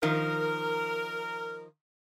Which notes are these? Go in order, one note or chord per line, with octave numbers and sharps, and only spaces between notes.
D#3 F3 A#4